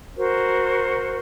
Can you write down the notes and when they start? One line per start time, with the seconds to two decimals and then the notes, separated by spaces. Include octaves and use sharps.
0.16 F#4 A#4 C5